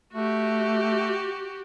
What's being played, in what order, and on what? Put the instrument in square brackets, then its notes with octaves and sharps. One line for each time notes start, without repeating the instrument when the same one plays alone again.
[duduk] A3 [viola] F#4 G4